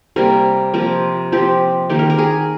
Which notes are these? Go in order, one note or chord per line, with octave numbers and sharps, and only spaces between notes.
C3 G3 A#3 A#4
C3 F3 A#3 A#4
F3 C4 G4
D#3 A#3 G4
A#4
A#4
G#4